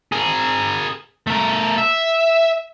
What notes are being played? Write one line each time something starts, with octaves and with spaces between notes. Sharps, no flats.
G#4 A#4
A3 A#4
E5